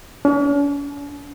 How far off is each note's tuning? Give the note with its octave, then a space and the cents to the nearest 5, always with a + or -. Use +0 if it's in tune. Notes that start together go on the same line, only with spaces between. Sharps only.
C#4 +45